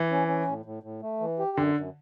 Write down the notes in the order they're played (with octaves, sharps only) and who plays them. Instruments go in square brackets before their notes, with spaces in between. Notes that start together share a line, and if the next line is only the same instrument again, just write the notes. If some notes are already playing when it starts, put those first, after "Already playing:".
Already playing: [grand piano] E3
[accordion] C#4
C#4
A2
A2
A2
A3
E3
G4
[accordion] F#2 [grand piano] D3
[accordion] F#2